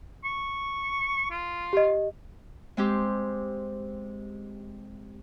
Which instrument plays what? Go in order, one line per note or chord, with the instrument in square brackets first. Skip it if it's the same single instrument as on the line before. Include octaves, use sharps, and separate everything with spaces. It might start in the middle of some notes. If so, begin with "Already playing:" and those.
[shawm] C#6
F4
[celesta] G4 D#5
[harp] G#3 C4 G4